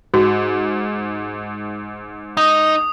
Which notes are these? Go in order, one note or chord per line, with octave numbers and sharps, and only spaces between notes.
G#2 F#4
D#4 D#6